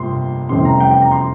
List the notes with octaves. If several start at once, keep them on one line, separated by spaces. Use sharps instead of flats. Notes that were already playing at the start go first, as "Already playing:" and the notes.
Already playing: G1 F2 C3 G3 A#3 C6
F1 E2 C3 G3 C#4 C6
A#5
G5
G5
A#5
C6